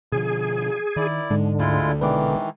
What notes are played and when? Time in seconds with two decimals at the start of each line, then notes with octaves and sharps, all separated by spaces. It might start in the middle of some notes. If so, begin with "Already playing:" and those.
0.12 B2 D3 F3 G#4
0.96 D#3 E4 D5
1.31 G#2 D3 G#3
1.59 D2 G#3 E4 F4
2.01 A#1 B2 D#3 E3 G#3 B4 D5 D6